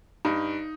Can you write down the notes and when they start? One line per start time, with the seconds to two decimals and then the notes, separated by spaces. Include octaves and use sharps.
0.25 G2 D#4